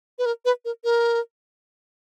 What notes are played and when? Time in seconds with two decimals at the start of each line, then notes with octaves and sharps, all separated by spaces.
0.18 B4
0.26 A#4
0.45 B4
0.65 A#4
0.84 A#4